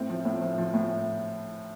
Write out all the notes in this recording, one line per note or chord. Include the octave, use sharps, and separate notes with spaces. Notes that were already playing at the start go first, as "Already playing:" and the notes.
Already playing: A2 C4
F3
A2
F3
F3
A2